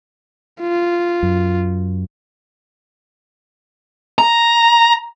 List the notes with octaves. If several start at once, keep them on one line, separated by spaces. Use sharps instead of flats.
F4
F#2
A#5